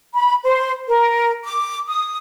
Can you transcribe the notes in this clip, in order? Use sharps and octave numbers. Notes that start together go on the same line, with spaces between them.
B5
C5
A#4
D6
D#6